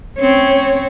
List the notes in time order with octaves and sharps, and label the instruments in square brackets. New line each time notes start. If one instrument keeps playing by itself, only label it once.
[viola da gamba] C4 C#4 [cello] C#5